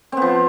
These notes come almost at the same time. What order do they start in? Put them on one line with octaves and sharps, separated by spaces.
C4 B3 F3